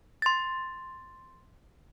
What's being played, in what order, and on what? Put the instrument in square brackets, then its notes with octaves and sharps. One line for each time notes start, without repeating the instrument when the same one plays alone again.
[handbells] C6 A6